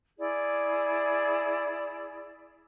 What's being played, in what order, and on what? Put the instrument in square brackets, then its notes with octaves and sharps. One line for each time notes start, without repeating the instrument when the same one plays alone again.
[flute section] E4 G#4 D5